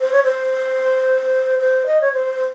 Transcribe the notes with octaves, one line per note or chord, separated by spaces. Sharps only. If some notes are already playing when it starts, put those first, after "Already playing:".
C5
C#5
C5
C5
D#5
C#5
C5